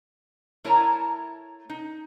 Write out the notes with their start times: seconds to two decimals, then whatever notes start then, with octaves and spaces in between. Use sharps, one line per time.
0.64 A3 E4 A#4 C#5 A5 A#5
1.70 D#4